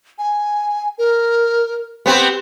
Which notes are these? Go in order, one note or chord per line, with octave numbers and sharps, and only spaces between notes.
G#5
A#4
B3 C4 G4